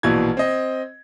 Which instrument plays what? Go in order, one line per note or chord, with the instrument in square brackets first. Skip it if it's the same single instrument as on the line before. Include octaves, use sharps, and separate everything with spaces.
[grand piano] A#1 B2 E3 G#6
C4 D#5